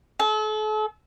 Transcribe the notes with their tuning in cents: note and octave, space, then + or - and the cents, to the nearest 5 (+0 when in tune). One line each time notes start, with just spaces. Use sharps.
A4 -40